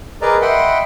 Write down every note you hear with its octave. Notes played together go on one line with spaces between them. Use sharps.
G#4 A#4 B4 D5 D#5 A#5
D#5 E5 F#5 G5 B5 C6